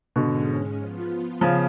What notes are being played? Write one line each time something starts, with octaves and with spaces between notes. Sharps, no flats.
G#2 B2 D3 G#3 C#4
F3 B3 F4
C#3 F3